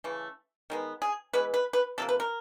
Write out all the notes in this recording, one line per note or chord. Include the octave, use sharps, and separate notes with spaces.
C#3 E3 A3
D#3 G#3 B3
G#4
E3 G#3 B3 B4
B4
B4
C3 F3 A#3 A4
B4
A#4